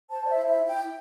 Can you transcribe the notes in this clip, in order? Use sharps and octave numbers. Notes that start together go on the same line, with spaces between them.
C5 A5
D5
E5
E4
E5
E4
G5